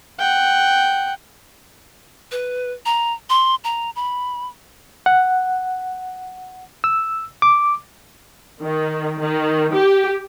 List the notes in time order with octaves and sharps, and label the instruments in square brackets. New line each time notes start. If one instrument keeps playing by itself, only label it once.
[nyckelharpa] F#5 G5
[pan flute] B4
A#5
C6
A#5
B5
[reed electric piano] F#5
E6
D6
[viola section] D#3
D#3
G4